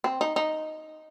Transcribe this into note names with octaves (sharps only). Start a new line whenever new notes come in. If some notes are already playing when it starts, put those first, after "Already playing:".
C4
D#4
D#4